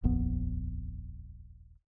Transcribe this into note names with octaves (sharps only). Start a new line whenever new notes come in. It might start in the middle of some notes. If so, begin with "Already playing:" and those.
D#1 A#1 F2 B3